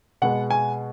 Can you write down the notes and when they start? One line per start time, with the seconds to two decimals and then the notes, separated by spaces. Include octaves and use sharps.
0.22 B2 G#3 B3 F#5
0.51 G#5